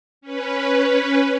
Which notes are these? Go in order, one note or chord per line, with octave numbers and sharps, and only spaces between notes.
C#4 B4